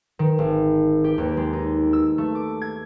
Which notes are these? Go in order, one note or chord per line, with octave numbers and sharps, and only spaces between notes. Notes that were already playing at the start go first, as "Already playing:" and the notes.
D#3
G#1
G4
D#2
G#3
D#4
E6
A3
D6
G#6